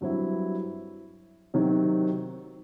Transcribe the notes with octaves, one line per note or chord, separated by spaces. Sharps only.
G2 F#3 C4 E4
C3 D#3 F#3 C4 F#4